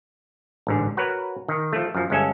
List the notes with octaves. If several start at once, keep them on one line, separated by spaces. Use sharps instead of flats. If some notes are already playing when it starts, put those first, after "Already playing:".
A1 G#2 D3
F#4 A#4 B4 C#5 F#5
D#3
F3 A3
F#2 F3
G1 G#3 C#4 A4 E5